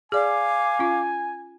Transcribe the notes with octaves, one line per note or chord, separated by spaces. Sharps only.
G#4 D5 F5 G#5 D6
C#4 F4